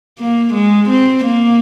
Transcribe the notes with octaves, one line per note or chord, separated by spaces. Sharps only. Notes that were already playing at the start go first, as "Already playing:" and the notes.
A#3
G#3
C4
A#3